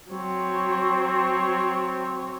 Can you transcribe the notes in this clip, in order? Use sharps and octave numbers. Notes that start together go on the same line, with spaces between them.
F#3 C4 C#5